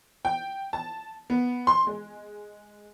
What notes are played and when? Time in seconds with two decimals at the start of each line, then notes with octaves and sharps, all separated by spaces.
0.25 G5
0.73 A5
1.30 B3
1.67 C6
1.87 G#3